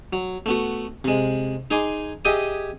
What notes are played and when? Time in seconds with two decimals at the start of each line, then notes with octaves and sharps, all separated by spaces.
0.13 F#3
0.46 A3 B3 F#4
1.04 C3 G#3
1.71 D#4 G#4 G#5 C6 D6
2.25 G4 G#4 D#5 E5 G5 G#5